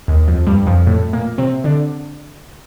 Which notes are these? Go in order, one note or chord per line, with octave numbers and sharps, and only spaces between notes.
D#2 D#3
F2 F3
G2 G3
F2 F3
A2 A3
A#2 A#3
C3 C4
D3 D4